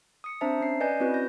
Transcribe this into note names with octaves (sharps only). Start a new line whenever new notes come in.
D#6 C#7
C4 D4 C5 E5 A5 A#5
C#4 C7
B4 D5 D#5 G#5 G6
C4 C#4 E4 F#4 B4
G6 A#6